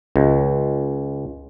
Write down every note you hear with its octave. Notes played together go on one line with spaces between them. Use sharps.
C#2